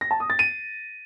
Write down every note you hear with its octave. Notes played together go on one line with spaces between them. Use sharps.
A#6
A5
D#6
A6
D#7